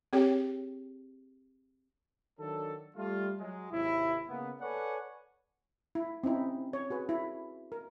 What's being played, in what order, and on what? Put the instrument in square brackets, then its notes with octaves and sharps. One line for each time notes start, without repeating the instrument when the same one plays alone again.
[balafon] C4 G4 G#4 C#5 G5
[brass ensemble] D#3 F#3 D4 A4
G3 A3 F4
F#3 G#3
G#1 D#2 C3 E4
C#3 G#3 A#3 B3
A4 B4 C#5 D5 F#5 G#5
[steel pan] E4
C4 C#4 D#4 E4
C#5
F#4 G#4 B4
E4
A#4